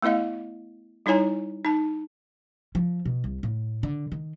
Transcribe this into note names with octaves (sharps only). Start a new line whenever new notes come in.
A3 B3 E4 D#5 F5
G3 D#4 E4 C#5 G#5 A#5
D#4 A5
F3
B2
C2
A2
D3
D#3